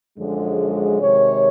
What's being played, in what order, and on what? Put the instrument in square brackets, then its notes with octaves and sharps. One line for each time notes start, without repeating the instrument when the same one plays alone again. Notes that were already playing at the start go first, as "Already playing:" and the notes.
[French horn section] F#2 D3 F3 G#3
C3 D#3 G#3 C#5